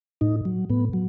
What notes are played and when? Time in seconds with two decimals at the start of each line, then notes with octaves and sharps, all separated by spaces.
0.21 A2 D#4
0.45 F#3
0.70 A2 B3
0.93 F#3